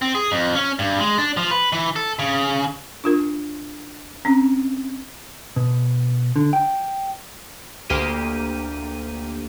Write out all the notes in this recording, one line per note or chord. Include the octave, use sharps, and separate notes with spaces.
C4
G#4
F2
C#4
G2
G#3
D4
F3
B4
E3
A4
C#3
D4 F4 A#4
C4 C#4
B2
D3
G5
D2 A#3 G4 D#7